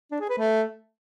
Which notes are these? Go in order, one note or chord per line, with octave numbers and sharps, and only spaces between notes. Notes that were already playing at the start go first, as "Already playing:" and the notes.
D4
G#4
B4
A3